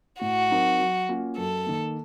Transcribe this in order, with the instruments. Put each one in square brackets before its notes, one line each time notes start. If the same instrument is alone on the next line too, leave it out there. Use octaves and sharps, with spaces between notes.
[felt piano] A2 [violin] F#4
[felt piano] F#3 C4 D#4 A#4
F#3
A#3 C#4 F4
[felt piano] F#2 [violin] A4
[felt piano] D#3 A#3